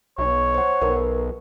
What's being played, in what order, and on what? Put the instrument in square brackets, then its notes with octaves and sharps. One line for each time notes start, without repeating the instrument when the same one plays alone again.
[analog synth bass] B1 [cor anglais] C#5
[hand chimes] C5 F#5
[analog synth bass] B1 [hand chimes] A#4 B4